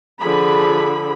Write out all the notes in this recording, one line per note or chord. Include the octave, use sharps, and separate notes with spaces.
D3 F3 G#4 B5